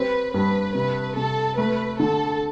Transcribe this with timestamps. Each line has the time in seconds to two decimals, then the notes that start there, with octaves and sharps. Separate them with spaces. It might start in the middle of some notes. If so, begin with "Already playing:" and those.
Already playing: G3 C4 B4
0.33 G2 B4
0.75 C3 B4
1.16 C3 A4
1.58 A3 B4
1.99 D3 A4